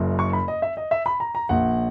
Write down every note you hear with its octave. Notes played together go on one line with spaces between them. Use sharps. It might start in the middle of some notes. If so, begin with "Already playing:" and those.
Already playing: F#1 F#2 C#3
C#6
B5
D#5
E5
D#5
E5
B5
A#5
A#5
A#1 A#2 F#5